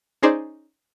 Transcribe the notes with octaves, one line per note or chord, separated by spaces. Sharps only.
C#4 D#4 G#4 C5 D5